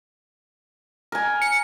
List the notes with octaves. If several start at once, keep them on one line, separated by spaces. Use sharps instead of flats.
A#4 G#5
C#7